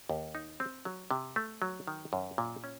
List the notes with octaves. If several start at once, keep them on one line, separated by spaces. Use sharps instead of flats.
D#2
D#4
C4
F#3
C3
A3
F#3
D#3
F#2
A#2
C#4